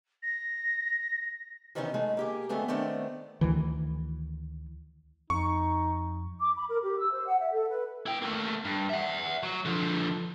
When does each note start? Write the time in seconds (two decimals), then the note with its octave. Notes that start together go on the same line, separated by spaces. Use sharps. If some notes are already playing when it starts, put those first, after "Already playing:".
0.22 A#6
1.75 C3 D#3 E3 B3 C#4 D#4
1.94 G#3 A3
2.17 A#3 G4 G#4
2.49 D3 F#3 G#3 A3 B3 C4
2.68 D#3 A3 B3 C4 D4
3.41 D2 D#3 E3
5.30 F2 D#4 C#6
6.40 D6
6.57 B5
6.69 A#4
6.82 G4
6.98 E6
7.12 C5
7.27 F#5
7.39 E5
7.53 A4
7.69 B4
8.06 E4 G5
8.22 A3 A#3
8.65 G2
8.90 E5 F#5
9.43 F#3
9.65 D3 F3